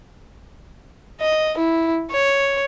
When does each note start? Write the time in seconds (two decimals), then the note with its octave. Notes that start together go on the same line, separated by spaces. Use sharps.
1.21 D#5
1.58 E4
2.11 C#5